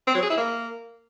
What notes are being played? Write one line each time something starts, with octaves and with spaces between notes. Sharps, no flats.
C4
F#3
G#4
E4
A#3